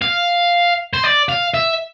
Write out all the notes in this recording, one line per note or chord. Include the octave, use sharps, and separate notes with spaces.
F5
C5
D5
F5
E5